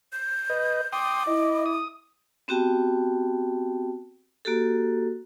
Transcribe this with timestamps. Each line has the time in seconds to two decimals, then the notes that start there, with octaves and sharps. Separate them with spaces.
0.12 G6
0.50 B4 D#5
0.92 G5 C6 D6 D#6
1.27 E4 D#5
1.66 D#6
2.48 B3 C4 F#4 G4 G5 A5
4.45 A#3 F#4 G4 A4